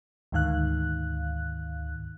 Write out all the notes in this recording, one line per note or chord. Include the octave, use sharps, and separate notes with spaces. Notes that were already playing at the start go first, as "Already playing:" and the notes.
D2 G#2 D#3 F5 F#6